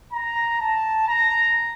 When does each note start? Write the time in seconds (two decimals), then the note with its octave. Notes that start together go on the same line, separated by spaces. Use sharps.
0.13 A#5
0.61 A5
1.08 A#5